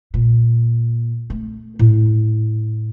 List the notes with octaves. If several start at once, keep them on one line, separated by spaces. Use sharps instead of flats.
A#2
A3
A2